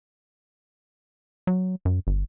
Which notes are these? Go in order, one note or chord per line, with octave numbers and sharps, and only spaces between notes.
F#3
F#2
G1